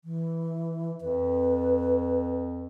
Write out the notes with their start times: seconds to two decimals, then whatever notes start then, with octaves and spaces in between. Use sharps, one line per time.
0.04 E3
1.01 F2 B4